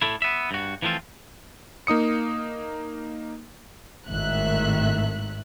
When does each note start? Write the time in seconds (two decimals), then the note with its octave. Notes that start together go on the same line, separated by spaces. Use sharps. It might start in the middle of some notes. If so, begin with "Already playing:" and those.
0.02 A2 A3 E4
0.22 B3 E5
0.51 G2 F#4
0.82 E3 F3 A3 C4 F4
1.87 A#3 D#4 D#6 C#7
4.09 G#1 A2 D#3 E5 F#6